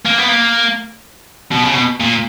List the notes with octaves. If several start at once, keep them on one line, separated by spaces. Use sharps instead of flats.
A#3
B3
A#3
B2
C#3
B2
A#2